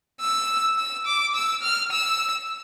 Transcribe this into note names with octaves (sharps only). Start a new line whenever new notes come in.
E6
E6
D6
E6
F6
E6